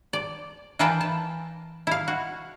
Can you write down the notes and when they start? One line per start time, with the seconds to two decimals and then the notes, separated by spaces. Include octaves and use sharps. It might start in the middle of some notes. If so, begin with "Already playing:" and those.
0.13 D5
0.79 E3 A#4 B4 F5 G5 A5
1.01 A5
1.87 E4 F5
2.08 F#4